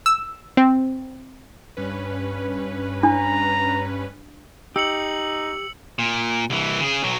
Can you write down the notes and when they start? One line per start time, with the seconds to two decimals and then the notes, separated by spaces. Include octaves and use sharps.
0.06 E6
0.57 C4
1.77 G2 C#4 B4
3.03 D4 A#5
4.76 D#4 G4 E6 C#7 F#7
5.99 A#2
6.50 C2 E3
6.81 C#3 G#4
7.03 B1 F#3